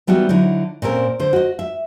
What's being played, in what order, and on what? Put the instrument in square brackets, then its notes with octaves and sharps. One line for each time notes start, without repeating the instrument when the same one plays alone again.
[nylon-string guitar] E3 G3 B3 D#4 F#4
D3 F#3 D#4 E4
A#2 C4 C#4 A4 A#4
D3 C5
F#4 D#5
E5